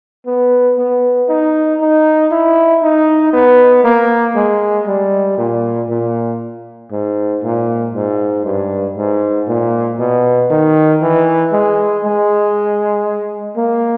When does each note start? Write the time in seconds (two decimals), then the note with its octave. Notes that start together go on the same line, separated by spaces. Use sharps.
0.26 B3
0.78 B3
1.29 D#4
1.80 D#4
2.32 E4
2.83 D#4
3.33 B3
3.84 A#3
4.35 G#3
4.87 G3
5.38 A#2
5.89 A#2
6.92 G#2
7.43 A#2
7.94 G#2
8.45 G2
8.97 G#2
9.48 A#2
9.99 B2
10.50 D#3
11.02 E3
11.53 G#3
12.04 G#3
13.57 A#3